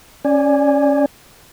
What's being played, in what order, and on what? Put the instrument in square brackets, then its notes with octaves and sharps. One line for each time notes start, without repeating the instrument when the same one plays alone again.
[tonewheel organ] C#4 D5 G#5